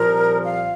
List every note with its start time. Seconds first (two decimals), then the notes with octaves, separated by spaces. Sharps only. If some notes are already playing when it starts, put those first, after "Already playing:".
Already playing: C2 A#2 F3 A#4
0.44 F5